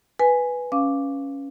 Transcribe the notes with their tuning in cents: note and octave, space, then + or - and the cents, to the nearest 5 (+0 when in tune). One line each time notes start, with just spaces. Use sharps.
B4 +0 G#5 +0
C#4 +0 F5 -5 D6 +0